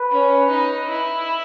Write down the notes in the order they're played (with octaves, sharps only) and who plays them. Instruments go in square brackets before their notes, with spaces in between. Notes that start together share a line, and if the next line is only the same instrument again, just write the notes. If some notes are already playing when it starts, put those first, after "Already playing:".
Already playing: [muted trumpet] B4
[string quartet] C#4
D#4
E4